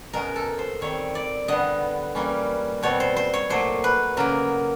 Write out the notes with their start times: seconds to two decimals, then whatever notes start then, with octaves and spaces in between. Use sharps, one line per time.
0.13 B2 G#3 C#4 A#4
0.36 A4
0.59 C5
0.81 D#3 G3 C4 C#5
1.15 D5
1.48 D3 G3 B3 D#5
2.15 E3 G3 A#3 C#4
2.83 B2 G3 C4 C#5
3.00 C5
3.16 C5
3.33 C#5
3.50 A#2 F#3 A3 C5
3.84 B4
4.17 C#3 F#3 A#3 A#4